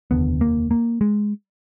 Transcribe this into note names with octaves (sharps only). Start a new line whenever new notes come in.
F1 D#2 D3 B3
A#3
A#3
G#3